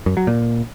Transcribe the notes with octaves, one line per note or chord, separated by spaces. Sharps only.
F#2
F#3
A#2